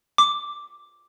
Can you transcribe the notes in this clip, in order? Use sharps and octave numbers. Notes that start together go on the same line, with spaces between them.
D6